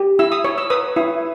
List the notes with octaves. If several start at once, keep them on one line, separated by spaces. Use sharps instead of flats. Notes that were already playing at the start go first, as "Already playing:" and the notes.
Already playing: G4
E4 E6
D#6
C#5
E6
B4 D#6
E4